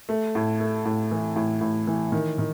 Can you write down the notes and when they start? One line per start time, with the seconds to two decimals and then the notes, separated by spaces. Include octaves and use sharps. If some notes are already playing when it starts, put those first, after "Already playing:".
0.09 A3
0.35 A2
0.60 A3
0.85 A2
1.11 E3
1.36 A2
1.61 A2
1.87 E3
2.12 D#3
2.38 D#3